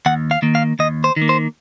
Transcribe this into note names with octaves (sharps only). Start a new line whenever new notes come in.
D#2 F#5
F5
D#3 A#3
F5
D#2 D#5
C5
D#3
A#3
C5